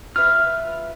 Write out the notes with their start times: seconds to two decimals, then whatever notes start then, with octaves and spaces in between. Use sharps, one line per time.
0.16 F4 B4 E5 F6